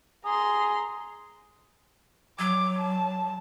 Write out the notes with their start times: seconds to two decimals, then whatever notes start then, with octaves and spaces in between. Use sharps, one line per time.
0.25 G#4 A#5 C6
2.39 F#3 D6
2.78 A5